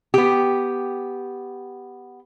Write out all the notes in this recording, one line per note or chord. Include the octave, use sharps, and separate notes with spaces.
B3 G4